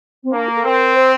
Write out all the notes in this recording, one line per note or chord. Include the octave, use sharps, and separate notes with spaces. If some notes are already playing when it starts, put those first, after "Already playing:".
C4
A#3 D4
A#4
A4
C4 A#4
C5